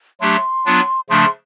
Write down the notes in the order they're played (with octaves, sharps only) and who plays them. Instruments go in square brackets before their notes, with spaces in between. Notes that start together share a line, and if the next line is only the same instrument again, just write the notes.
[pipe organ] F#3 A3 D4 G4 [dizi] C6
[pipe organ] F#3 B3 D4 F4
[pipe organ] C#3 F3 A3 D4 [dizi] C6